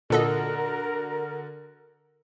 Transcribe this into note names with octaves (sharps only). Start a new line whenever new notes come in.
A#2 D3 F#4 A4 A#4 D#5